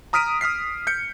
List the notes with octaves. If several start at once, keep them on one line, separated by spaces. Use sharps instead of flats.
A#5 D#6 F6 B6 D7 D#7
D#6 F6 B6 C7
G6 C#7